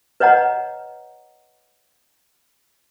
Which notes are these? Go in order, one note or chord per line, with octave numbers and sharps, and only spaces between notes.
B4 C#5 D#5 F#5 A#5